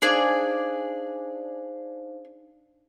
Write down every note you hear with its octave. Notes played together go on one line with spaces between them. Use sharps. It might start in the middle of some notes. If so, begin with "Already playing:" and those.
D4 D#4 G#4 C5 D5 F5